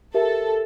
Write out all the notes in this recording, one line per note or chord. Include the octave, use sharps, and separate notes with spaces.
G4 A4 A#4 E5